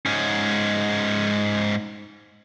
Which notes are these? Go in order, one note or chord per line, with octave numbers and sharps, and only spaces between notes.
G#2 C#4